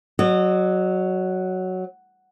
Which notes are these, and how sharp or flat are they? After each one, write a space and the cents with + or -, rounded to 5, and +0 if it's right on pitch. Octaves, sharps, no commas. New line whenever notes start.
F#3 +0 D#5 -35